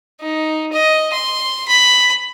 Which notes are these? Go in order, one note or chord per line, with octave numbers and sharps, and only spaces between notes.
D#4
D#5
C6
B5